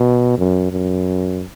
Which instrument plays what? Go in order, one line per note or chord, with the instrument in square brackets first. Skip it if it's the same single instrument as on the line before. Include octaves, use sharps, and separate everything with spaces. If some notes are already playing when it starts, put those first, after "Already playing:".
Already playing: [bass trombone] B2
F#2
F#2